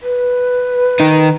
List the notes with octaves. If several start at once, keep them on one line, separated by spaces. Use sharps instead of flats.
B4
D#3 D#4